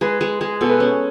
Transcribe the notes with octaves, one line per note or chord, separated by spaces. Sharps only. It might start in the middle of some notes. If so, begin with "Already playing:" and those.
G#3 B4
G#3
G#3
B2 A4
B4
C#4 A4